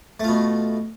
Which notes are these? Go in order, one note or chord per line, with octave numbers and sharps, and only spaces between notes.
B2 A3 F4